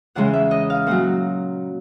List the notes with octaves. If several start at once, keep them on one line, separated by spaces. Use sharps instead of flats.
E2 C#3 E3 G#3 F#5
E5
D#5
F5
A#2 F#3 F#5